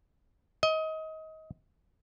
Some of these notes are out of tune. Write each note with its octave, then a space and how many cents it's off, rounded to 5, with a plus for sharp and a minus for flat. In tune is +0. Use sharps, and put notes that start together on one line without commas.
D#5 +25